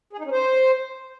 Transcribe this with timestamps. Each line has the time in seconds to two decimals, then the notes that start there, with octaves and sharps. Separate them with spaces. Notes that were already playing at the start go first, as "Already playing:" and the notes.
0.13 G#4
0.19 D#4
0.26 C#4
0.32 C5